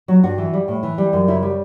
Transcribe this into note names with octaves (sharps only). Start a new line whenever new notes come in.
F#3 F#4
G2 F#4
E3
G3
A2
E3
G3
F#2
C#3 E4
G3